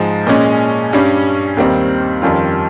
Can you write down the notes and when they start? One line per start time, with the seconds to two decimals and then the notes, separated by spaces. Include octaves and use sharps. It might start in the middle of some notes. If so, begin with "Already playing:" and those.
Already playing: G#2 F3 G#3
0.27 A#2 G#3 C#4
0.93 G2 G3 C#4
1.57 D#2 D#3 G3 C4
2.22 F2 D#3 G3 C#4 F4